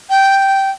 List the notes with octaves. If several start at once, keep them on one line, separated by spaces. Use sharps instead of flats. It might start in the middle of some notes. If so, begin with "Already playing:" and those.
G5